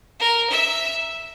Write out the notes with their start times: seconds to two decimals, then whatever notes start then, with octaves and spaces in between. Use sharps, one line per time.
0.20 A#4
0.50 E5